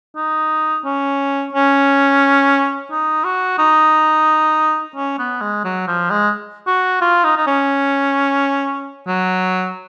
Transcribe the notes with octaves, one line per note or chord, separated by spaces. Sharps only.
D#4
C#4
C#4
D#4
F#4
D#4
C#4
B3
G#3
F#3
F3
G#3
F#4
F4
D#4
D#4
C#4
F#3